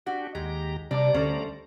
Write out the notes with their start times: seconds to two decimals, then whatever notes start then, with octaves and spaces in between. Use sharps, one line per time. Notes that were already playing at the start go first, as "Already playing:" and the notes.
0.07 D4 F#4 G4
0.35 D#2 G#3 G4 A#5
0.91 C3 G3 D4 D5 A#5
1.14 D2 C#4 A4 C5